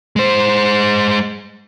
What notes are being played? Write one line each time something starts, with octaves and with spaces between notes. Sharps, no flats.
G#3 C5